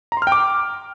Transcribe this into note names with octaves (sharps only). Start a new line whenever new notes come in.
A#5
C6
F6
G5
D6